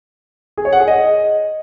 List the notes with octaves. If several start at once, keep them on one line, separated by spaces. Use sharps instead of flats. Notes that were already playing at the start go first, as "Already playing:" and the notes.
G#4
C#5
F#5
G#4
D#5